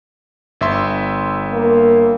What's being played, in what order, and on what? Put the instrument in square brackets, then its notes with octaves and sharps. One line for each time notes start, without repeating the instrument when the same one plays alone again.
[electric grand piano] G1 E5 C6
[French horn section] A#3